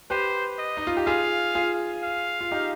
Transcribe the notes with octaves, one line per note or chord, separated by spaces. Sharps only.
G4 B4 C5
D#5
D#4
F4
G4
F4 G#4 F5
F4 G#4
F5
F4
D#4 G4